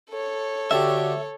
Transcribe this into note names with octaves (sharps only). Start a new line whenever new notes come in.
A4 C#5
D3 F#4 G4 E5